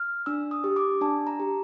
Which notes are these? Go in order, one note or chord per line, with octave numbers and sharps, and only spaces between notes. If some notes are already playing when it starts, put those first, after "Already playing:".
Already playing: F6
D4 E6
D#6
G4
D6
D4 A5
A#5
G4